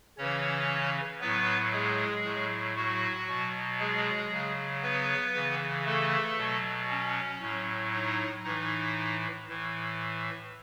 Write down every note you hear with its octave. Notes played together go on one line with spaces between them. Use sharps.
C#3 E3 C#4 C#5
A2 F#3 B3 B4
G#3 G#4
A2 F#3
F#3 F#4
B2 F#3
G#3 G#4
C#3 F#3
B3 B4
C#3 E3
A3 A4
B2 F#3
C#4
A2 F#3
D#4
A2 E3 D#4
A2 E3